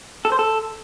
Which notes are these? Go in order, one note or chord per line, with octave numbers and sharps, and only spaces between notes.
A4
C5
A4